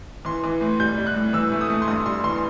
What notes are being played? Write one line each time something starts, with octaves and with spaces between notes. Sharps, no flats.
E3 C6
E3
A2
G3 G6
G3
F#6
A2
E3 E6
A3
D#6
A3
C6
G2 D#6
G3 C6
E3 C6